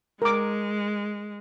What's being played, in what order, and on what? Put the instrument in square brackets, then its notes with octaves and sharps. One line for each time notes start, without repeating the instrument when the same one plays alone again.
[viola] G#3 [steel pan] A#4 D6